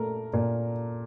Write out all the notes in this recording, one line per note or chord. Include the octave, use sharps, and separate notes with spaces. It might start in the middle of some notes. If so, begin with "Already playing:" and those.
Already playing: A#2 A3 A#4
A#2